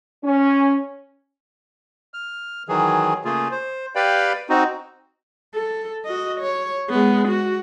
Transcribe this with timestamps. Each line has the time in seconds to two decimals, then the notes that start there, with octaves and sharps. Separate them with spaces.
0.24 C#4
2.14 F6
2.68 D#3 E3 F#3 G#4
3.25 C#3 A3 A#3 F4 G#4
3.51 C5
3.95 G4 B4 D5 F5 G5 B5
4.49 C4 D#4 F#4
5.55 A4
6.06 F#4 D#5
6.40 C#5
6.90 G#3 B3
7.28 F#4